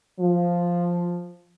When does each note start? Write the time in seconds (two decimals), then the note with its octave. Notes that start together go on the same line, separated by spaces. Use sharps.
0.20 F3